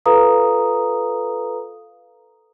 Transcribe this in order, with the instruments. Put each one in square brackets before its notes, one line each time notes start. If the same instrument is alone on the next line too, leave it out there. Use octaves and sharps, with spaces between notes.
[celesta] F4 A4 B4 F5 A#5 D#6